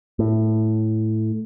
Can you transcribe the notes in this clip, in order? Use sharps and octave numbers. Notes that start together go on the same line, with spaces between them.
A2